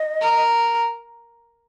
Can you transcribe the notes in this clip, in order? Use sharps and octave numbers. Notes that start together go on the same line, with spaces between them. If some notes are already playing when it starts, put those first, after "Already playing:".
Already playing: D#5
A#4